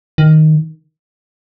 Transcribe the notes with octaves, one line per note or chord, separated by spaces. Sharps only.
D#3